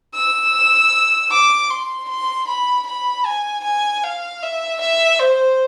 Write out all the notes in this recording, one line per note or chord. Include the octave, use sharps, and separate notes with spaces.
E6
D6
C6
C6
B5
B5
G#5
G#5
F5
E5
E5
C5